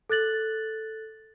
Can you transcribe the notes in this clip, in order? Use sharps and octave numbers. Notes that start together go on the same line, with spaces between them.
A4 F#6 A6 F#7